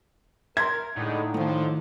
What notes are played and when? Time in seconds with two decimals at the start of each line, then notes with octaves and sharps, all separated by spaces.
0.57 A#4 E5 A#5 C6 G#6
0.96 A2 D3 G#3 D#4
1.34 D3 D#3 F3 A3